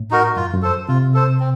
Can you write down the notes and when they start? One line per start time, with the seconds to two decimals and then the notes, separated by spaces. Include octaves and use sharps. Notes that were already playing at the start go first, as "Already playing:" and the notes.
Already playing: A2
0.11 D#4 F#4 A#4
0.36 F#2 F4
0.54 F#2
0.62 A4 C5
0.88 C3 F4
1.14 A4 C5
1.40 C4